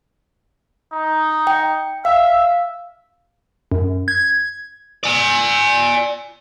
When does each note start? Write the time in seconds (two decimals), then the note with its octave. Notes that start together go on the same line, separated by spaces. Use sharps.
0.92 D#4
1.47 G5
2.05 E5 F5
3.72 F#2
4.08 G#6
5.04 D5 G#5